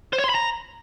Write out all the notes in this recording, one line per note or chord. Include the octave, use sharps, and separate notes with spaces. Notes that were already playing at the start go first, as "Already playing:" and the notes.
C5
C#5
C6
B5
A#5